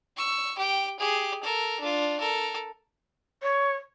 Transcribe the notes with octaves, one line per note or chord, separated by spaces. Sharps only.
C#6 E6
G4 G5
G4 G#4
A4 A#4
D4 F4
A4 A#4
C#5